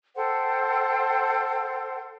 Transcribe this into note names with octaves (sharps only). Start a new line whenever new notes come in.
A4 C5 F#5 G5